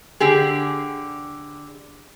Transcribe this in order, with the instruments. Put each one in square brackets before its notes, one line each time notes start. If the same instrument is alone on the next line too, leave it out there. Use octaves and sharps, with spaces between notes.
[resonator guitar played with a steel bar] D3 G4 G#4